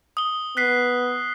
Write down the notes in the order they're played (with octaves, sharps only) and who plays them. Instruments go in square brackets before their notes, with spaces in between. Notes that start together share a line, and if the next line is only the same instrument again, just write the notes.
[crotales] D#6 G7
[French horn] B3 [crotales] F#6 B6 C7